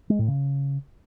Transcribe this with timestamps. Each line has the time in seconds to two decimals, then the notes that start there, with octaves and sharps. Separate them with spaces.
0.10 G#3
0.19 A2
0.28 C#3